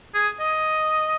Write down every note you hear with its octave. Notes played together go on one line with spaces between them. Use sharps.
G#4
D#5